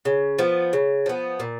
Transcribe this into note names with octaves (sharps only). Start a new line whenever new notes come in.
C#3
F3 B3
C#3
F3 B3
A#2